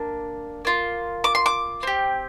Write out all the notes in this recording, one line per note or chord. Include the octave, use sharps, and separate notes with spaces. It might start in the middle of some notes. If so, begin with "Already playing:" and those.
Already playing: A#3 D4
A#3 F4
D6
C6
D6
C4 G4